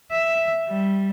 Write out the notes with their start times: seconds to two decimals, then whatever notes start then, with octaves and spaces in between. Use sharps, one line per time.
0.11 E5
0.69 G3